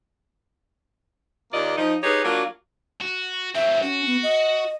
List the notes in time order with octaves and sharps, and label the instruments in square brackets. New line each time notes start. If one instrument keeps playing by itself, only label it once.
[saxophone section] D#2 A#2 A#3 D5 D#5
F3 D#4
D#4 G4 G#4 B4 C#5
F#3 A#3 D4 F4 F#4
[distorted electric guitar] F#4
[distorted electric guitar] F#3 C4 [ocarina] E5
[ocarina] C#4 [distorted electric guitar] F#4
[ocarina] B3
D#5